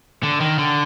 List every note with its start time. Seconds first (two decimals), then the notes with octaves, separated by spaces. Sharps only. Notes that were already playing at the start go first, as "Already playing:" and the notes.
0.23 D3
0.40 D#3
0.59 D3